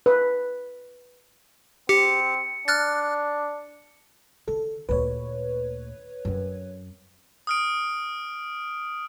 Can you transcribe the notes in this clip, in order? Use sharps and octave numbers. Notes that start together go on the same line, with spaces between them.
B4
C4 G4 C#7
D4 F6 F#6 A6
D3 A4
D2 A#2 B4 C#5
F#2 C4
D#6 F6 D7